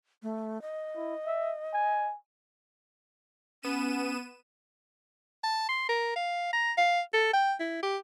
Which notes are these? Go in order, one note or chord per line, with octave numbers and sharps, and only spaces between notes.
A3
D#5
E4
E5
G#5
B3 C#4 D#7 E7
A5
C6
A#4
F5
A#5
F5
A4
G5
E4
G4